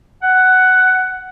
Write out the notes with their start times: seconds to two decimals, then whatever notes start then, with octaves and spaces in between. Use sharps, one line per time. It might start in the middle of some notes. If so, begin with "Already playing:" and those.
0.22 F#5